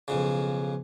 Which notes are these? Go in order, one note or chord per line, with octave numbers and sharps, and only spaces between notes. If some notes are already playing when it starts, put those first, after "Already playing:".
B1 F2 C#3